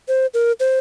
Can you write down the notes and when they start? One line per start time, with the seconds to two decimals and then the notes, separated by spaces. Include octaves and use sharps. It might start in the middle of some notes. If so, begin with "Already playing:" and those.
0.08 C5
0.34 A#4
0.60 C5